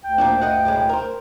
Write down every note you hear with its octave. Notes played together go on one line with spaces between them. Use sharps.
D2 G5
A#2 F3 D4
G2 D#5 F#5
B1 A2 G#3
A#4 C5